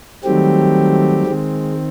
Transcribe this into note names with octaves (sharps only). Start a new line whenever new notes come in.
D#3 F#3 G3 A3 C4 G4
D#3 G#3 C4